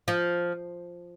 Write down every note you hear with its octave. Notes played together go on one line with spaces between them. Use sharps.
F3